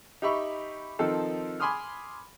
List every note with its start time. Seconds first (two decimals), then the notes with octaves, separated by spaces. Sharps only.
0.22 D#4 G4 E5 B5 C#6
0.99 D#3 F3 C4 D#4 A4
1.60 G#5 B5 C6 D6 D#6 F6